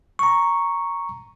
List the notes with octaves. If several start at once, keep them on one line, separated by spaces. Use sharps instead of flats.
A#5 C#6